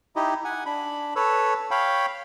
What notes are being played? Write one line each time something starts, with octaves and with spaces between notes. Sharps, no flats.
D#4 E4 G4 D#5
F#5 G#5
D4 B5
A4 B4 C#5 E6
C#5 F5 G5 B5